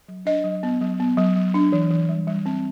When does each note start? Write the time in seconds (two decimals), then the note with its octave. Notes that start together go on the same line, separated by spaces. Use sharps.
0.08 F#3
0.26 D4 D#5
0.44 F#3
0.63 B3
0.81 F#3
1.00 B3
1.17 F#3
1.36 F#3
1.54 D4
1.72 E3
1.91 E3
2.09 G3
2.28 G3
2.46 C4